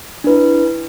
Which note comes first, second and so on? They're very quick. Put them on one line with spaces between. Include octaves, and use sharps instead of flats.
D4 B4 E4